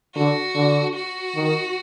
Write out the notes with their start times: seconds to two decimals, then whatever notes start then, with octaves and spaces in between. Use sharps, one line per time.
0.15 D3 F#4
0.55 D3
0.95 F#4
1.36 D#3